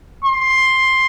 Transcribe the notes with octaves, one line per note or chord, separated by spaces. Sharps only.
C6